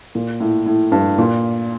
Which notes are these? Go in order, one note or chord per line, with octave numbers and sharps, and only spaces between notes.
A#2
A2
A2
G2
A#2